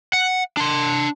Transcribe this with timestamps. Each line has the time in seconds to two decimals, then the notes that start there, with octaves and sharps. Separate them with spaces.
0.13 F#5
0.57 D4 C6